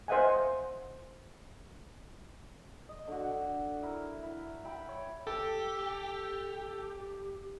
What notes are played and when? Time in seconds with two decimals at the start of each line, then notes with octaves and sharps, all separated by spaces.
0.08 C5 D#5 E5 F#5 G#5
2.89 D#5
3.07 D3 F#4
3.82 E4 A#4
4.23 E4
4.64 E5 G5 B5
4.89 C#5
5.27 G4 A4